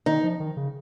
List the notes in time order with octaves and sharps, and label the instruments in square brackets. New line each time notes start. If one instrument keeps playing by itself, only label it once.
[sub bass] D#3 [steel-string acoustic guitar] D#4
[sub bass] F3
D#3
C#3